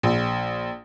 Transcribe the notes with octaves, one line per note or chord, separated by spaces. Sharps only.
A#1